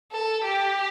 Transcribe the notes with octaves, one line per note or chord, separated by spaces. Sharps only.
A4
G4